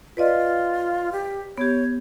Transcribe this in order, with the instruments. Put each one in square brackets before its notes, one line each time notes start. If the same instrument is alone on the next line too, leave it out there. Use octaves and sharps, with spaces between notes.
[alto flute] F4 [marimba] B4 D5 D#5
[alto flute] G4
[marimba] B3 G4 [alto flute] C#5